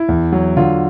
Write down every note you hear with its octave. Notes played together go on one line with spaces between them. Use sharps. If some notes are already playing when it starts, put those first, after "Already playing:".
Already playing: E4
E2
F#3
D3 F4